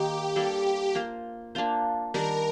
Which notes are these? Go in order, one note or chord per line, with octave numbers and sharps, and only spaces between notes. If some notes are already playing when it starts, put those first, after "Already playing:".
Already playing: D#3 A#3 D#4 G4
G3 A#3 D4 A4
A#3 F4 C5
A#3 D4 F4 C5
D#3 G3 D4 A#4